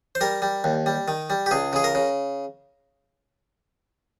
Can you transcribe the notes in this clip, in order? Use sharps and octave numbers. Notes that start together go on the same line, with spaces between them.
C5
G3 A#4
G3
D#2
G3
D#3
G3
G4
C#2 G#4
C#3 G#4
A#4
C#3